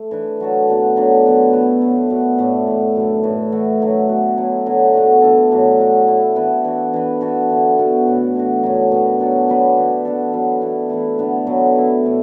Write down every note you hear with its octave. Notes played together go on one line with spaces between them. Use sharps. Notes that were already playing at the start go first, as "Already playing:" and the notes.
Already playing: A3
E3 D4 B4
F#3 A3 F#4 A4
F#2 D3 B3 D4
D3 F#3 D4
B2 F#3 B3 F#4
E3 B3 E4 B4
F#2 F#3 A3
B2 A3 D4 F#4
A2 A3 D4
A2 E3 B3
F#2 D3 A3
A2 E3 A3
E3 A3 F#4 A4
D3 F#3 A3
B2 B3 F#4
F#3 A3 E4
D3 F#3 B3 D4
B2 A3 D4 F#4
E3 D4 A4
A2 F#3 D4
F#3 A3 F#4
A2 A3 E4
E3 B3 D4 B4
E3 D4 F#4
E3 D4 B4
E3 B3 F#4 A4
D3 B3 E4
B2 B3 F#4 A4
A2 E3 A3 F#4
E3 D4 F#4
F#2 D3 F#3
B2 B3 F#4
F#3 D4 F#4 A4
B2 F#3 D4 B4
E3 B3 F#4
E3 D4 F#4 A4
B2 F#3 B3
E3 B3 D4
E3 A3 E4
D3 B3 D4
B2 F#3 A3
E3 B3 E4
A2 A3 D4 A4